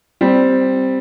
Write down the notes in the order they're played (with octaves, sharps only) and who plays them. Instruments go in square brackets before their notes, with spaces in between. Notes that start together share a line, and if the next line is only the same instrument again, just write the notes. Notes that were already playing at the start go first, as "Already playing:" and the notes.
[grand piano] G3 C4